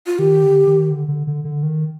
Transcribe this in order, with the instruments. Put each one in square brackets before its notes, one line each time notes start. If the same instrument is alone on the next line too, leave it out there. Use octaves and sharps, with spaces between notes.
[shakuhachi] F4
[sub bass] D#3 [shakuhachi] G4
[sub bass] D3
D#3
D3
D3
D3
D3
D#3